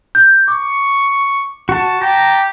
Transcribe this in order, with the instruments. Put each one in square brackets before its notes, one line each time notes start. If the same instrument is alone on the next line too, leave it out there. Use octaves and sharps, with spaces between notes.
[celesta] G6
[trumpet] C#6 [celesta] D6
[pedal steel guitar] F#4 A5
[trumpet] G4 [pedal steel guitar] A5 A#5